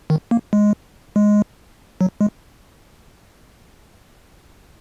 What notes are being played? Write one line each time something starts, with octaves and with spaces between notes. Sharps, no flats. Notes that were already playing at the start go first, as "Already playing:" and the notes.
D#3
A#3
G#3
G#3
F#3
G#3